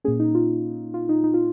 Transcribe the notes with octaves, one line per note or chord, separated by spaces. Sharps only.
A#2 A#3 C#4 G#4
D#4
F4
F4
D#4
D#4
F4